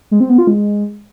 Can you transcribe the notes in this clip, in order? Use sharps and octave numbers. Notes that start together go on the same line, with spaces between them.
G#3
C4
B3
F4
G#3